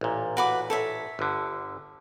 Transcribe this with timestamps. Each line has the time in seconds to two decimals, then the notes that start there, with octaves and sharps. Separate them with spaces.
0.01 A1 A#2
0.37 F#4 B4 D6
0.70 A4 C#5 E5
1.19 G1 D3